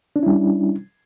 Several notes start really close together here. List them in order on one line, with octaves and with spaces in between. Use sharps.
D4 C#4 E4 G3